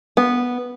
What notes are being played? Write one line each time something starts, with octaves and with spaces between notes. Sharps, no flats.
B3